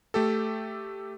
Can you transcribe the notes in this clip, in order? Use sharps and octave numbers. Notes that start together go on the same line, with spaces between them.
A3 G4 A4